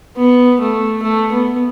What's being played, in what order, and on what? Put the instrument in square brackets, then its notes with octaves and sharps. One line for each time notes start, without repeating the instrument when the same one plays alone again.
[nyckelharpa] B3
A3
A3
B3